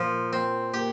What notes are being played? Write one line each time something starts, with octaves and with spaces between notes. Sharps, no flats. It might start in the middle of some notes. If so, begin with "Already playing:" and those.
Already playing: A#2 F3
C4
A#3 G4